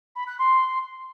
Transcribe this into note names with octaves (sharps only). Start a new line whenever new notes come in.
B5
F#6
C6